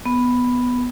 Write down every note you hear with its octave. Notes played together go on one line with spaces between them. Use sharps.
B3